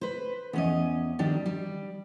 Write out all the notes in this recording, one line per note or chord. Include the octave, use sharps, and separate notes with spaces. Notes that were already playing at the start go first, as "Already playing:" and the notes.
B4 C5
E2 C#4 D#5
D#3 G3 D4
G3